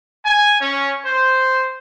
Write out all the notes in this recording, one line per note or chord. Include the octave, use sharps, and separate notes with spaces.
G#5
C#4
C5